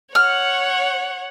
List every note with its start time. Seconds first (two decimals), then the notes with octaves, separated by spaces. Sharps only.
0.15 C#5 F#5 F6